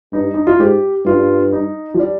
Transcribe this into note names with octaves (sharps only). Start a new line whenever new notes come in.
G2 D#4
D#4
F4
G#2 G4
G2 F4
D#4
F3
G3